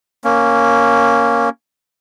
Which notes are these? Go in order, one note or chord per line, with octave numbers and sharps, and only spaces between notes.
A#3 C#4